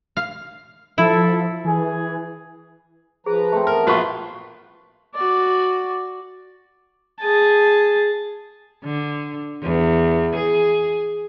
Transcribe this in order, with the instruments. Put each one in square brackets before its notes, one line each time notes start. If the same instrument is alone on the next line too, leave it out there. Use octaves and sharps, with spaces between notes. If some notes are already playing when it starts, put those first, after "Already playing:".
[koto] F5
[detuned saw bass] F3 [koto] E4 [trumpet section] A4
[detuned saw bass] E3 [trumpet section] G#4 G#5
[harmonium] F3 B4 A#5 [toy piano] G#4
[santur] A3 C4
[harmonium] E3 B3 [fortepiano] A#4
[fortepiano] A#1 F4 B4 [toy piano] F#4 C#6
[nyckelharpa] F#4 D5
G#4 A5
[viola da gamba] D3
E2
G#4